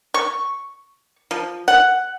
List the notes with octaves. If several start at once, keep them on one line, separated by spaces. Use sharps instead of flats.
C#6
F3
F#5